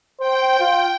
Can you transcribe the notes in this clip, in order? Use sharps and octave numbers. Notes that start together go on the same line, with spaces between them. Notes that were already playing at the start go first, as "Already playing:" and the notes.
C5 G5
F4